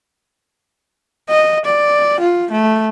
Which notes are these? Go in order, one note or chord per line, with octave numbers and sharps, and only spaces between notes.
D#5
D5
F4
A3